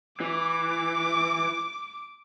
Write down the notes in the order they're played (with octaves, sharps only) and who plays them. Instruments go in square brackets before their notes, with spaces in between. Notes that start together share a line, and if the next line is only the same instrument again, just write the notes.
[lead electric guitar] E3 [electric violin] D6